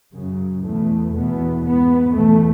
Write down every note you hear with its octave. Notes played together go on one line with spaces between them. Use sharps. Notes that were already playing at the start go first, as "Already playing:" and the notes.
F#2 C#3
E2 B2 A3
E2 B2 B3
G#2 B3
E2 B2 A3